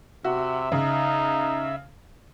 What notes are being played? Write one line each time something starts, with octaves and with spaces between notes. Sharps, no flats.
C3 F#4 E5
C#3 D#4